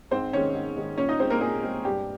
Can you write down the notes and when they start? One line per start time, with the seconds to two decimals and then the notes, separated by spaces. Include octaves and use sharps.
0.11 G#2 C4 C5
0.33 D#3 G#3 C#4 C#5
0.55 G#2
0.77 D#3 G#3
0.98 A#2 C#4 C#5
1.09 D#4 D#5
1.19 G#3 C4 C5
1.30 A#3 A#4
1.41 A#2 G#4
1.63 G#3 C4
1.85 G2 G4